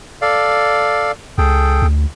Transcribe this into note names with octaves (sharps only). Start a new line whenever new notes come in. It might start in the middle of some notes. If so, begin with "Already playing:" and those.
A4 D5 F5
C#2 G#4 A4 G5
D2